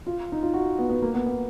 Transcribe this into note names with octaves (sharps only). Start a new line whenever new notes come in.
F4
D#4
F4
F#4
B3
B3
A#3
B3
B3